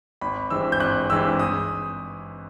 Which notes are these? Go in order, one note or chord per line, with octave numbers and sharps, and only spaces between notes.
G#1 B5
G2 E3 G#3 C4 E6
G6
G#1 F#6
G2 E3 G#3 C4 E6
D#6